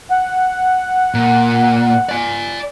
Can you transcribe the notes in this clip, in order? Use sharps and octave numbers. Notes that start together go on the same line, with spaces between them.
F#5
A#2
D5 G#5